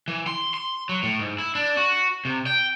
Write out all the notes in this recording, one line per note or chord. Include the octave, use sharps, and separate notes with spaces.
E3
C6
C6
F#3
A2
G#2
E4
D4
F#4
C3
G5